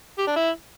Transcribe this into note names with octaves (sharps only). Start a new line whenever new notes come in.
G4
D4
E4